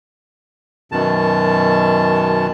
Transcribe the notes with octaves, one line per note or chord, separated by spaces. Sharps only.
F#2 B2 D#3 A5